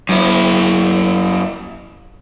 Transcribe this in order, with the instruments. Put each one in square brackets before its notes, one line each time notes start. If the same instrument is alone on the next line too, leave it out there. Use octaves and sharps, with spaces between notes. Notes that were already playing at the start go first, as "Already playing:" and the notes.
[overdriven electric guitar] F#2 E4